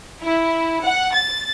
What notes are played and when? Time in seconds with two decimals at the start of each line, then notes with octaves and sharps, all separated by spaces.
0.22 E4
0.82 F#5
1.13 A6